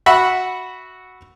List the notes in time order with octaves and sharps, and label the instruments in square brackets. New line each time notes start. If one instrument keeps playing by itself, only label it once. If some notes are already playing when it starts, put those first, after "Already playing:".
[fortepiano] F#4 E5 F#5 B5